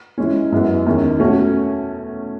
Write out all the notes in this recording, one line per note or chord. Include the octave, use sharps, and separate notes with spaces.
E3 G#3 C#4
F#2 E3 G#3 B3
E2 D#3 G#3 C#4
B2 A3 C#4 F#4